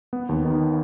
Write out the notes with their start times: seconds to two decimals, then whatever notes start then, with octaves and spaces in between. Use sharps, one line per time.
0.13 B3
0.29 D#2
0.45 D#3